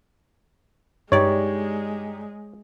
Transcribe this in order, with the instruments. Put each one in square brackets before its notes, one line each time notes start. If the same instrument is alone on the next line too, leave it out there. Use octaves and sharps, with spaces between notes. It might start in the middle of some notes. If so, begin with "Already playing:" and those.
[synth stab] G2 D5 [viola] G#3 [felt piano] D#4 G4 [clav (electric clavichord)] C#5